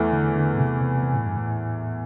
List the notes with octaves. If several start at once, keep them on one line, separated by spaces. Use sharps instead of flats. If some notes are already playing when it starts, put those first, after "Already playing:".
Already playing: E2 E3 A3
D3
D3
A2
C3
C3
C3
A2
G2
A2